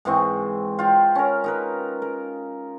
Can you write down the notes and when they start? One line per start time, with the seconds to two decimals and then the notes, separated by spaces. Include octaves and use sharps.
0.05 G#2 E3 C4 C#6
0.79 F4 G5
1.15 C#4 A#4
1.44 D#4 A#4 B4
2.02 A#4